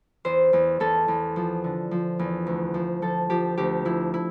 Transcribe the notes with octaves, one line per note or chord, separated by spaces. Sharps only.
E2 C5
E2
E2 A4
E2
F3
D3
F3
E2
D2
F3
F3 A4
F3 G4
D2 G4
F3 E4
E4